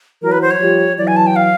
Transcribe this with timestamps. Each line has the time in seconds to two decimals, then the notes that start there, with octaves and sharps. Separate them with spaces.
0.22 E3 F#3 A#4
0.32 B4
0.42 C5
0.51 C#5
0.60 F3 G3
0.98 E3 F#3 D5
1.07 G#5
1.16 A5
1.27 G5
1.36 F5